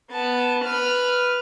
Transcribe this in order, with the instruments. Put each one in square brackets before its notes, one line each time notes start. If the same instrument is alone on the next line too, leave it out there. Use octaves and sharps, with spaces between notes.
[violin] B3 A5
B4 F6